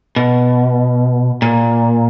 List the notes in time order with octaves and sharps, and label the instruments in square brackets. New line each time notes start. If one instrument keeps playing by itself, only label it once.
[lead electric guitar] B2
A#2